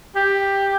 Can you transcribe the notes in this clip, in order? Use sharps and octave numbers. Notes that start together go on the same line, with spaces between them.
G4